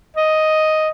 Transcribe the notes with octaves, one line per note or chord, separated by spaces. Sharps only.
D#5